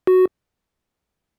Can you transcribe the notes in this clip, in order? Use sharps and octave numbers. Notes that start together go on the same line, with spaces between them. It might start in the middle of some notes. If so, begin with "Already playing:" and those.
F#4